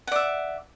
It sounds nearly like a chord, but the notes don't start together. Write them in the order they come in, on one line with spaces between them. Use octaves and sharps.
F#5 D5 E5